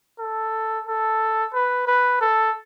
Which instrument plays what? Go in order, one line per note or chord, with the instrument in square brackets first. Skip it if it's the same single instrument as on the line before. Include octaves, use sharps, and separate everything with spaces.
[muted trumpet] A4
A4
B4
B4
A4